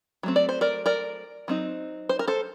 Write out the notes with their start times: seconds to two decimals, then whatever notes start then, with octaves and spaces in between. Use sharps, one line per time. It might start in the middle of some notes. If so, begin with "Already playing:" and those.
0.23 F#3 A3 C4
0.36 D5
0.49 C5
0.61 A#4 D5
0.86 A#4 D5
1.48 F#3 C4 D#4
2.09 C5
2.19 A#4
2.28 A4 C5